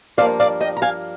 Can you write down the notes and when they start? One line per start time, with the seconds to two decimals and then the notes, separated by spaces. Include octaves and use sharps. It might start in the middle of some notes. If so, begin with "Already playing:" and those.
0.17 G2 F3 A#3 D5 F5
0.40 D5 F5
0.61 D#5 G5
0.77 A#5
0.82 F5 G#5